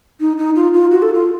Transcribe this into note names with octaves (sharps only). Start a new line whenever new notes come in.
D#4
D#4
F4
F4
F#4
A4
F4